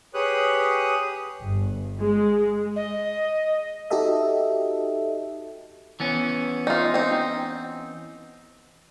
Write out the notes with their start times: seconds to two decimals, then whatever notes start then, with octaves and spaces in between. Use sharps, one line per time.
0.14 G4 G#4 B4 C#5 D#6 F#6
1.42 G1
2.01 G#3
2.76 D#5
3.90 D#4 F#4 G4 A4 D#5 E5
6.00 E3 B3 C#4
6.67 D#4 F4
6.94 C4 D#4